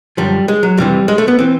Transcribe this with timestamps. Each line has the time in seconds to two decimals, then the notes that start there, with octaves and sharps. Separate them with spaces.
0.17 F#2 D3 F3 G3
0.48 G#3
0.63 F#3
0.77 F2 C3 E3 G3
1.08 G#3
1.18 A3
1.28 B3
1.39 E3 C4